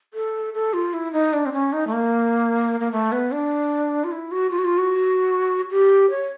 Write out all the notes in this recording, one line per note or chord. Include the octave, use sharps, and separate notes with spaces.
A4
A4
F4
E4
D#4
D4
C4
C#4
D#4
A3
A#3
A#3
A3
B3
D4
F4
E4
F#4
F4
F#4
F4
F#4
G4
C#5